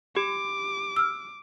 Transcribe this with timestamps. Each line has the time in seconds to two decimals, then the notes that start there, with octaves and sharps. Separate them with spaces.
0.17 G4 D6
0.96 E6 F6